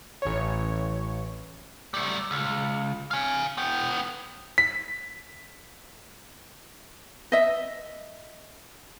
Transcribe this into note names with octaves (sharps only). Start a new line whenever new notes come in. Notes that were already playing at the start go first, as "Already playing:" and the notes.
A1 C#5
G3 A3
C#2
F5 G#5
B3 G5
B6
D#5 E5